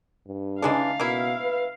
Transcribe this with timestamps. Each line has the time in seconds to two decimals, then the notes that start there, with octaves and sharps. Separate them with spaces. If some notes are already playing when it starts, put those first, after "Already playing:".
0.27 G2
0.62 C#3 E3 G#3 D4 D#4 G#4 F5
1.00 B2 A#3 E4
1.41 B4